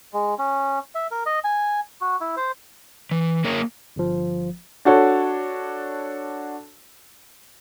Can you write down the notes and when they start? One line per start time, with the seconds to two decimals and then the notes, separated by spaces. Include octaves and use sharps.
0.13 G#3
0.38 C#4
0.95 E5
1.11 A#4
1.26 D#5
1.44 G#5
2.01 F#4
2.21 E4
2.37 C5
3.11 E3
3.45 A#3 G#4 A#4 C#5
3.96 G1 F3
4.85 D4 F#4 A4 C#5